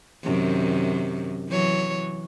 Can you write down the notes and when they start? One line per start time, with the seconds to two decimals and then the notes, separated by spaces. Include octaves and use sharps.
0.23 F#2 C3 D#3
1.49 E3 F#3 C#5